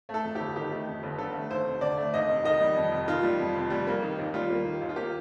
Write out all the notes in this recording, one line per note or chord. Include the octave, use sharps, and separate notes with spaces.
A3
A4
F2
G1 G4
D#3 G4
A3
F2
G1
D3 A4
A3
D#2 C5
F1
D3 D5
A3
D#2 D#5
F1
D#3 D#5
G3
F2
F1
D#3 F4
G3
F2
F1
G3
A#3
D#3
D#2
G3 F4
A#3
D#3
D#2
F4
A#3 G4